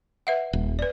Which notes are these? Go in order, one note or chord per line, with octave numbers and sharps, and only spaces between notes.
B4 E5 F#5
D#1
B4 D5